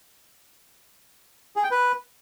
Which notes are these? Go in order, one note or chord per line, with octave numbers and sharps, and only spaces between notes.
G#4
G5
B4